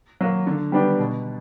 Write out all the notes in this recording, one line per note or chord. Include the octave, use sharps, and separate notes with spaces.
F#3 A#3
D3
G3 B3 D4 G4
B2